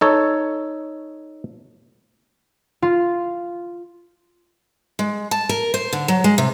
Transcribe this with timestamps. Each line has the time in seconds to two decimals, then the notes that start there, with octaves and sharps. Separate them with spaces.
0.01 D#4 A4 C#5
2.82 F4
4.99 G#3
5.31 A5
5.49 A#4
5.74 C5
5.93 D3
6.08 F#3
6.24 G#3
6.38 C3